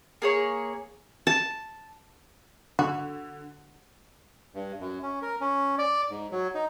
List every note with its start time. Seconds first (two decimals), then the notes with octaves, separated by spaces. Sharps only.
0.22 A#3 G#4 C#5
1.27 A5
2.79 D3 F#4
4.55 G2
4.80 F#2
5.03 C#4
5.22 A#4
5.41 C#4
5.78 D5
6.10 G#2
6.31 F#3
6.55 D#4